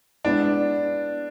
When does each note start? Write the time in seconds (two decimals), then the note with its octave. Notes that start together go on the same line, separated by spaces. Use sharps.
0.25 G#3 B3 D4 E4